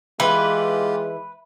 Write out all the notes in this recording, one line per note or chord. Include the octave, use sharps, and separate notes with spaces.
E3 G#3 F4 G4 B4